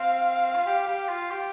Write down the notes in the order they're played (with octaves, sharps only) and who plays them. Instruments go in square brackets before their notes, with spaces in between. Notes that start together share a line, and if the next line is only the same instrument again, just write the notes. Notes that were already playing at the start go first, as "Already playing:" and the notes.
Already playing: [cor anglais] C4 [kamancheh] F5
[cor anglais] F4
G4
G4
F4
G4